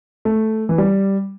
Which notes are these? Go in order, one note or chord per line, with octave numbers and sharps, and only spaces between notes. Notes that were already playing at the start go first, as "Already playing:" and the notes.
A3
E3
G3